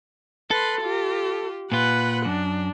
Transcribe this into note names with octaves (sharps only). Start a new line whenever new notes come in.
A4 B4 C6
F4 G4
A#2 F4 B4 F#5
F#2 D4